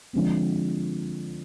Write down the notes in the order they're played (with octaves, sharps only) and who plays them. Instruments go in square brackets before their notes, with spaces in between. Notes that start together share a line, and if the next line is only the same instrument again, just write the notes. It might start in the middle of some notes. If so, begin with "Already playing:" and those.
[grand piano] D3 F3 G#3 C4